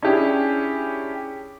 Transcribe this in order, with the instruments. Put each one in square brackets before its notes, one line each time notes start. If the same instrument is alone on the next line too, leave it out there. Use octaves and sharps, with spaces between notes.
[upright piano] C#4 D4 E4 G4 G#4